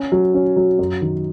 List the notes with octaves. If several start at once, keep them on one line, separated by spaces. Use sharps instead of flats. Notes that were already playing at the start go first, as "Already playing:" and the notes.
Already playing: C#4
F#3
C#4
F#3
F#2
D#3